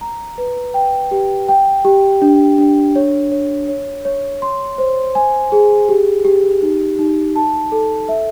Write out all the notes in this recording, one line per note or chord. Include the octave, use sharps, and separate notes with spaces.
A#5
B4
G5
G4
G5
G4
D4
D4
C#5
C#5
C#5
C#5
C6
C5
G#5
G#4
G4
G4
D#4
D#4
A5
A4
E5